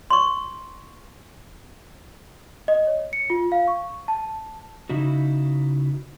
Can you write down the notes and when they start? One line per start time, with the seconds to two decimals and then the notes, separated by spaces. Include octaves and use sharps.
0.10 C6 C#6
2.68 D#5
2.87 C#5
3.13 C#7
3.30 F4
3.52 F5
3.68 C#6
4.08 A5
4.89 C#3 D#4 E4 F#4